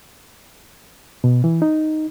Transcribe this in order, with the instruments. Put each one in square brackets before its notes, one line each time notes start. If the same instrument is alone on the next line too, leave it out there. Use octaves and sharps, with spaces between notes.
[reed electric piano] B2
E3
D#4